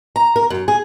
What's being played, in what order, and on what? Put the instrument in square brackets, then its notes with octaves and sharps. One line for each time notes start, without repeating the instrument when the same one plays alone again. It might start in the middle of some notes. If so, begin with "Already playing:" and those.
[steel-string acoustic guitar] A#5
A#4
F#2
G#4